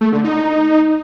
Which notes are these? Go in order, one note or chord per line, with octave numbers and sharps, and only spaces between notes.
A3
D3
D#4